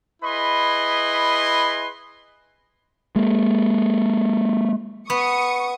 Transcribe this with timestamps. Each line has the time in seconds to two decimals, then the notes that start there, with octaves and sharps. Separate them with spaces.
0.23 E4 G#4 B4 D#5 B5 C6
3.16 G#3 A#3
5.10 B3 C#6 D#6 C#7